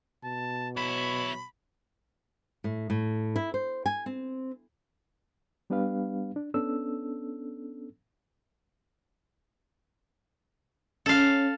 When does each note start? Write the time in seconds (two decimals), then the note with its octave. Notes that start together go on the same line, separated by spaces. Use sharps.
0.24 B2 A5
0.77 B1 E4 C#5 B5
2.64 A2
2.90 A2
3.36 E4
3.54 C5
3.86 G#5
4.06 C4
5.70 G3 B3 D4 G4 B4 F5
6.36 D4
6.54 B3 C#4 D4 A4 E6
11.06 C#4 A4 F5